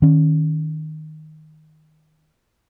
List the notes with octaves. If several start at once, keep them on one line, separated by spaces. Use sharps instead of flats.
D#3 C#4